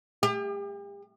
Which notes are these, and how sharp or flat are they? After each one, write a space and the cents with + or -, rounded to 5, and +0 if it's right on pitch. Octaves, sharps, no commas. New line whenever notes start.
G4 +40